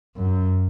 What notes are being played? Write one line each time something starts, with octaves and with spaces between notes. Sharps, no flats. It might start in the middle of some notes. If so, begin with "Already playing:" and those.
F#2